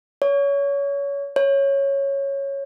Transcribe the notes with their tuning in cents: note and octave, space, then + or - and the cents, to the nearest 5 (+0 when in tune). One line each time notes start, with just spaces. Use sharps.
C#5 +25
C#5 -5